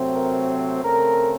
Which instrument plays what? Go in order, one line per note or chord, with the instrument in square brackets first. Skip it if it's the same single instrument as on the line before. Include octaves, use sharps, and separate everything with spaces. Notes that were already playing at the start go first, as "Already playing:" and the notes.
Already playing: [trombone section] C3 F#3 A3 C4
A#4
C5
C#3 A3 C4 A#4